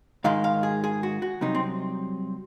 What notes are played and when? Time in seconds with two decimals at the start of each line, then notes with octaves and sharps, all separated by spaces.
0.24 G#2 D#3 G#3 F5
0.44 F5
0.63 G#4
0.84 G#4
1.03 F#4
1.22 F#4
1.41 C2 C3 F#3 D#4
1.55 C4